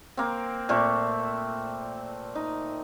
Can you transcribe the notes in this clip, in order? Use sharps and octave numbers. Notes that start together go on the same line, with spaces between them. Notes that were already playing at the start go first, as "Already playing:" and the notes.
A#3 C4
A#2 A3 C4
D#4